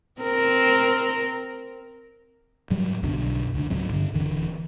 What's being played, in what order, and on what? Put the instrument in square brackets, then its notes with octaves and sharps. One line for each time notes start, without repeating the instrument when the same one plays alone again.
[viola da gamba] C4 A#4
[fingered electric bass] G#2 F#3 G3
B1 F#2 B2 D3
C#2 D3
C#2 G#2 F#3 C4
G2 D3
D#1 D3 E3